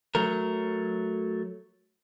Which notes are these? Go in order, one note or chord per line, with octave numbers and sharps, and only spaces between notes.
F#3 A3 A#4